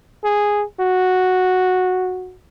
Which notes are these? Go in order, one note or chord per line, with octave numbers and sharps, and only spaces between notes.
G#4
F#4